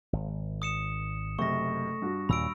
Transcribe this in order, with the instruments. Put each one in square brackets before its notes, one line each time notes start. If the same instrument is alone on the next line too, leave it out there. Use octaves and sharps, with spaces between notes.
[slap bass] G#1
[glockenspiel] D#6 C#7 E7
[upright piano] F#1 C3 [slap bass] A3 [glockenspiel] C#6 A#6
[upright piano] G2 F#4
[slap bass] D#2 A#2 [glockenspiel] B5 E6 D7